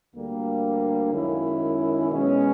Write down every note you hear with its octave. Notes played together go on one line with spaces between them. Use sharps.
D2 D3 G3 A#3
F#2 D#3 G#3 C#4 E4
B2 G#3 C#4